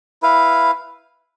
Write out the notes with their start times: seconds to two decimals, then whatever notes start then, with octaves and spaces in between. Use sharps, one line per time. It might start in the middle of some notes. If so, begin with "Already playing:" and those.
0.23 E4 B4 F5